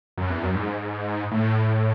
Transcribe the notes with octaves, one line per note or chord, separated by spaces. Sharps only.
F#2
E2
F#2
G#2
A2